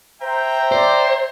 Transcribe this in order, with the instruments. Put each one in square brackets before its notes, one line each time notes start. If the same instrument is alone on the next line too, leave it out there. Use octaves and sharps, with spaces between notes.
[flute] C5 [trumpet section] E5 G5 A#5
[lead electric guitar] C5 [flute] D5